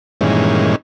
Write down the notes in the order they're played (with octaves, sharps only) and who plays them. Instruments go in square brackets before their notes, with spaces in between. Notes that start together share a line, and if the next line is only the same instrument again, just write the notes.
[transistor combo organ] G2 A#2 D#3 E3 G#3 C#4